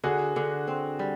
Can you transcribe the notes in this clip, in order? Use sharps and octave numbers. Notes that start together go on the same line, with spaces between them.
D3 F#4 G#4
D3
C4
G3